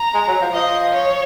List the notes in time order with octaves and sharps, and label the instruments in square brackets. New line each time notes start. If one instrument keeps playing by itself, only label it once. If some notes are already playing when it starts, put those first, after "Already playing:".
Already playing: [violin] A#5
[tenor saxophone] G#3
F#3
F3
[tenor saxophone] F3 [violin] D#5
[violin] C#5